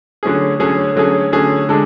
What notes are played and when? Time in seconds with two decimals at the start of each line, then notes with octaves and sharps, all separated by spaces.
0.23 D3 F#3 A3 C#4 G#4
0.60 D3 F#3 A3 C#4 G#4
0.96 D3 F#3 A3 C#4 G#4
1.32 D3 F#3 A3 C#4 G#4
1.69 D3 G#3 D4 A4